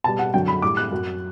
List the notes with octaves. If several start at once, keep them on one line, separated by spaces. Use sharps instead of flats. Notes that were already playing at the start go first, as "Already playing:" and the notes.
B2 G3 A5
F#5
F#2 D3 F#3 G5
B5
A2 G3 D6
F#6
F#2 F#3